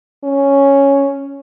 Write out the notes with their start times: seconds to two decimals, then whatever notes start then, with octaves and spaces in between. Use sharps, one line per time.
0.24 C#4